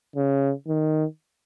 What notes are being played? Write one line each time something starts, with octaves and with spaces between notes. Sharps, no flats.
C#3
D#3